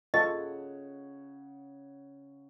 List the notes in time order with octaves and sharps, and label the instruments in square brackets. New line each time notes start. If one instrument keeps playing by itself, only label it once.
[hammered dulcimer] C#3 C#5 F#5 [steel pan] F4 A4 C#6 [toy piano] D#5